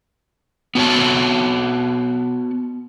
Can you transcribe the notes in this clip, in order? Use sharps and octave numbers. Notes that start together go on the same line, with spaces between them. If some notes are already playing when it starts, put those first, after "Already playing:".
B3 F#4 C#5 A5